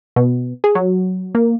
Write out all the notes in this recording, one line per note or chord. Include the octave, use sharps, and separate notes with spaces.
B2
G#4
F#3
A#3